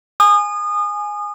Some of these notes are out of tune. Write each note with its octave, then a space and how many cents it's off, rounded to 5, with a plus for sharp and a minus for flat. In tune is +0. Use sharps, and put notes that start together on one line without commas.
G#5 +0 D#6 -30